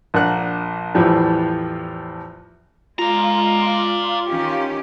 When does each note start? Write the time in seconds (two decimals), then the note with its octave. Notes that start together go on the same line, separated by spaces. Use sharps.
0.14 A#1 D4 A#4 F#5 F#6
0.94 E2 A2 F3 G3
2.99 G#3 F4 D5 A#5
4.29 D#3 C#4 G4